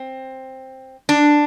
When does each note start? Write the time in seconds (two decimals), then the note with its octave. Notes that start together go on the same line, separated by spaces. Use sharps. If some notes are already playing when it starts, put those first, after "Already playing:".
Already playing: C4
1.09 D4